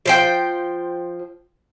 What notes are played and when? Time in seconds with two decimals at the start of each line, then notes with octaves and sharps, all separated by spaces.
0.06 F3 C5 G5